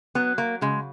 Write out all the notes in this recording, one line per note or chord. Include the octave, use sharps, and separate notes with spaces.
F#3 B3
A#3
C#3 G#3